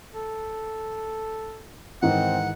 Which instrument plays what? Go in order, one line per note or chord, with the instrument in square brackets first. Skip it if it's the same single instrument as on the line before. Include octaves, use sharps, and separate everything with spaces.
[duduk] A4
[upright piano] G#2 D#3 E3 [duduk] C4 [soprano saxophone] F#5